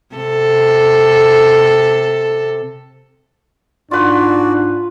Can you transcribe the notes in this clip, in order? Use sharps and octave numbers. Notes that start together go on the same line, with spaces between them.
C3 A4
G#2 D4 F4 F#4 B4 D5